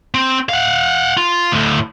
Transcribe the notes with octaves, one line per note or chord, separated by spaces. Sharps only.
C4
F5 F#5
F4
D2 A2